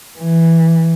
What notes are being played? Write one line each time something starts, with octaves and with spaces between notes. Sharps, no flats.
E3